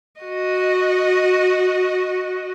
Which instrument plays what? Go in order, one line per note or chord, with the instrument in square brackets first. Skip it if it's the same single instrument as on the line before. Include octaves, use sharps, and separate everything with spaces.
[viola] F#4 D#5